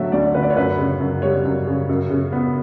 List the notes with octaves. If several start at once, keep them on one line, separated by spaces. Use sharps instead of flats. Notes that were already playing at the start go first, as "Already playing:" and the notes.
Already playing: D3 F#3 A3 E5
D2 D5
D3 B4
D5
C#5
F#2 B4
C#3
F#2
G3 C#5
F#2
C#3
F#2
C#3
B3